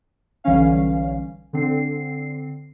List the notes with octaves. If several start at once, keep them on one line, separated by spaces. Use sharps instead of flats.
B1 D3 E3 G3 C#4 F5
D3 C4 C7